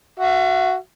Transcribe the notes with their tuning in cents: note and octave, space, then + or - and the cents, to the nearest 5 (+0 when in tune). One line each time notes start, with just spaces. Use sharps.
F#4 +0 E5 +40